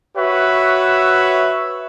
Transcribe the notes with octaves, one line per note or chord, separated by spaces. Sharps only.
F#4 B4 C#5 E5